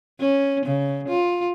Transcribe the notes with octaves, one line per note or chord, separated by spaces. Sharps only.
C#4
C#3
F4